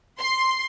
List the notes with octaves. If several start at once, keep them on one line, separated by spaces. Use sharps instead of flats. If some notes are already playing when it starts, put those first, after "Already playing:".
C6